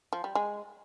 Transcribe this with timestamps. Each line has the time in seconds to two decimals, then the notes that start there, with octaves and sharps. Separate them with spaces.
0.13 F3
0.24 G3
0.35 G#3